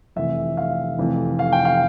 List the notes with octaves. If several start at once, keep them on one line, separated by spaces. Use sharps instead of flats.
F1 F2 E3 E5
F5
F1 F2 E3
F5
G5
F5